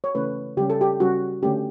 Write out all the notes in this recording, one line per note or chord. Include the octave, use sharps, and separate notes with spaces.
C#5
C#3 E3 A3 C#4 B4
C#3 G3 C#4 G4
A4
G4
C#3 G3 C#4 F#4
D3 A3 C#4 G4